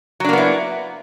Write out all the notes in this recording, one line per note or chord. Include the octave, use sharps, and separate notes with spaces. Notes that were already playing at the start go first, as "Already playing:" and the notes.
F#3 A#3 B3 D4 E4